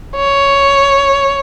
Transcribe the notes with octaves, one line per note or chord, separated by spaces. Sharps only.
C#5